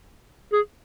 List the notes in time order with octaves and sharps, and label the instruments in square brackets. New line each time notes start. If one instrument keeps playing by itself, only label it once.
[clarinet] G#4